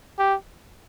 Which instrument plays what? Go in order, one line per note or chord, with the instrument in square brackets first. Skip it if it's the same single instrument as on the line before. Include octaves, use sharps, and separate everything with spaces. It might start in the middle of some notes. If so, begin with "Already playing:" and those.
[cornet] G4